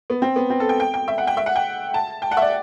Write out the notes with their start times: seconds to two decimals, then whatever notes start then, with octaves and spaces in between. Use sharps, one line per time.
0.10 B3
0.22 C4
0.36 B3
0.50 C4
0.60 A4
0.69 G5
0.80 G5
0.94 G5
1.08 E5
1.18 F#5
1.27 G5
1.37 E5
1.46 F#5
1.56 G5
1.94 A5
2.22 G5
2.31 F#5
2.37 E5
2.42 D5